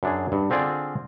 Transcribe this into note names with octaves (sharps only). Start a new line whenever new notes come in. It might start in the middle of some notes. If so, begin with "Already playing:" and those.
F#2 D4 G#4
G2
D3 C4 F4 G#4 D5